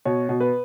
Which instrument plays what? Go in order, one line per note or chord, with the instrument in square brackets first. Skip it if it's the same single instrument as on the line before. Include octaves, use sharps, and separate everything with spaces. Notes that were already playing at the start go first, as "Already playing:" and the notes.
[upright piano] B2 C#5
B2
B4